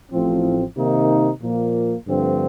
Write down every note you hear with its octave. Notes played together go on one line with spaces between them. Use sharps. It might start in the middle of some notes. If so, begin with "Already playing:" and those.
A1 A2 F3 C4
C3 D#3 A#3 D#4
A#2 F3 A#3
G2 D3 F3 A3 C4